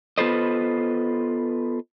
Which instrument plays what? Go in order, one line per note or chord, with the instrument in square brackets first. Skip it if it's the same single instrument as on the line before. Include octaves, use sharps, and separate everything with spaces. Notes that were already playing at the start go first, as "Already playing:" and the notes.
[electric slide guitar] B3 F4 A4 B4 C5 D#5